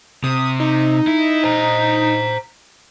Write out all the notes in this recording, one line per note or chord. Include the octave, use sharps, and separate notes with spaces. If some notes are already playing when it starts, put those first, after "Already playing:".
C3 D#6
D#4
E4
C5 A#5